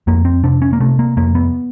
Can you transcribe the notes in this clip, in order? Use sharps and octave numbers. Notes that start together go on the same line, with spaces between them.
F2 A#3
C4
C3 D4
C#4
A#3
C3 A3
A#3
F2 A#3
B3